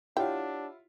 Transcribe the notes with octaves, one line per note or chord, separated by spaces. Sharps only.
D4 E4 F4 G4 C#5 F#5 G5